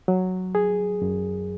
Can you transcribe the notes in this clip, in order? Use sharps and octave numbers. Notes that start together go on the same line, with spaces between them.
F#3
G#4
F#2